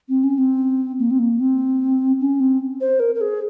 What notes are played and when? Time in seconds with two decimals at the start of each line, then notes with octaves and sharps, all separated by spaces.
0.09 C4
0.24 C#4
0.38 C4
0.99 A#3
1.10 C4
1.19 A#3
1.40 C4
2.20 C#4
2.40 C4
2.81 C5
3.00 A#4
3.15 A#4
3.21 G#4